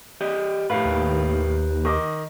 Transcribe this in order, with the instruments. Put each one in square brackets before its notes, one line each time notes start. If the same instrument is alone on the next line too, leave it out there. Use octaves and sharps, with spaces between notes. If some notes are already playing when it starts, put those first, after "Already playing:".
[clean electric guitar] G4 D5 D#5
[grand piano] A2 F5 [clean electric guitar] G4 A#4 B4
[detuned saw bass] D#2
[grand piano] D#3 D#5 D6